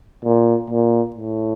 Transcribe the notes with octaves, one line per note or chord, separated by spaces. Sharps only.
A#2
A#2
A2